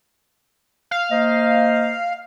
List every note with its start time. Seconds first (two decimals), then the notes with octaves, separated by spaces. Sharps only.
0.91 F5
1.11 A#3 C5 D#5